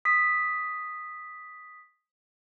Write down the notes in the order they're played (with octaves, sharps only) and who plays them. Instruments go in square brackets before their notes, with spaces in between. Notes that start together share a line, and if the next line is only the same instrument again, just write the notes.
[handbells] D#6 B6